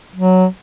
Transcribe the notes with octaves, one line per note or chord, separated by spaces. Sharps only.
F#3